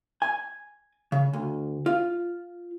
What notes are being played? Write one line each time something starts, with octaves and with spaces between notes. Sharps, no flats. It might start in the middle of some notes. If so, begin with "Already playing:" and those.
G#5
C#3
D2
F4